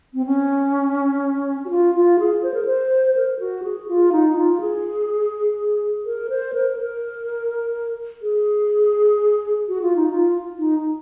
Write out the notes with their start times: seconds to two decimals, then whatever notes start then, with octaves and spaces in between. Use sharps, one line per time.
0.14 C4
0.26 C#4
1.65 F#4
1.70 F4
1.95 F4
2.19 G#4
2.43 C5
2.54 A#4
2.65 C5
3.16 A#4
3.40 F#4
3.64 G#4
3.88 F4
4.12 D#4
4.37 F4
4.61 G#4
6.05 A#4
6.30 C5
6.54 A#4
6.78 A#4
8.22 G#4
9.68 F#4
9.82 F4
9.96 D#4
10.10 F4
10.59 D#4